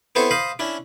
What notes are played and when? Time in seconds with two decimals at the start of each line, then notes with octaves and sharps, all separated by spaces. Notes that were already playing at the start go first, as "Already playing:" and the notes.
0.15 B3 C4 E4 A4 C5 C#5
0.31 C5 D#5 F5 B5
0.59 C#4 D4 E4